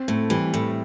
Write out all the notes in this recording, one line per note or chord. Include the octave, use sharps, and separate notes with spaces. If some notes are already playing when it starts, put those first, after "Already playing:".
Already playing: C4
A2 A3
E3 G3
A2